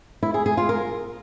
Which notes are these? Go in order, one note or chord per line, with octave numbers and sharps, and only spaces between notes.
E4
G#4
G#4
F4
A#4